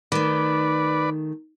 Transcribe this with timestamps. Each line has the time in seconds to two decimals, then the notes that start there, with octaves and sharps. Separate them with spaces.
0.12 D#3 A3 B4 D5